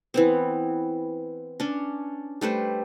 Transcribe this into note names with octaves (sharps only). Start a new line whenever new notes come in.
E3 B3 C4
C#4 D4
G3 A3 B4 C5